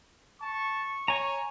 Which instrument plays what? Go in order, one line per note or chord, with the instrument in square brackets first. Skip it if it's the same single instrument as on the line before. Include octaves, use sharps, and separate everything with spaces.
[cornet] A5 [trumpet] C#6
[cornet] C#5 [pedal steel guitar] G#5 A#5